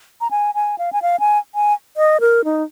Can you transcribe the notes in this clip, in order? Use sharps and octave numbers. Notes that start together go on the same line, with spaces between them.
A#5
G#5
G#5
F5
G#5
F5
G#5
G#5
D#5
A#4
D#4